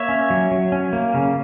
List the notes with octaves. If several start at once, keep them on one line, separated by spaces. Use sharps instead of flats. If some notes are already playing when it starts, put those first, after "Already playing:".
Already playing: A#3 C#5 E5
C#4
F#3
F#3
C#4
A#3
C#3